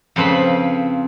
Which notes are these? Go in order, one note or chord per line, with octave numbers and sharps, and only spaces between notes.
F2 C#3 C4 B4 B5